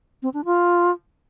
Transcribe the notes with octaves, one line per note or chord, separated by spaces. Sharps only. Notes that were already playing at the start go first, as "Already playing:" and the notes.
C4
D4
F4